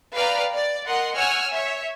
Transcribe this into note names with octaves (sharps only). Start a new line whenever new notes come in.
B4 D5 F5 G5 A#5
D5
A#4 D#5 F#5 C6
C#5 F#5 G#5 E6 F6
C#5 E5